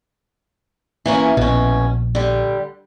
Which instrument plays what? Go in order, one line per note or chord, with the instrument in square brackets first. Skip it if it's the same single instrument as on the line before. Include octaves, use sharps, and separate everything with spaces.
[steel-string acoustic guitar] E3 A#3 C#4
[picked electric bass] A#1 [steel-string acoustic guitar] B2 C#4
[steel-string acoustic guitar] D3 G3